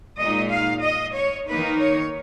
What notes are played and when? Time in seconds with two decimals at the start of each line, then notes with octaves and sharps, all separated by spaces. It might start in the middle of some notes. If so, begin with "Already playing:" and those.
0.18 A#2 G#3 D#4 D#5
0.50 F5
0.83 D#5
1.15 C#5
1.48 D#3 A#3 D#4 B4
1.80 C#5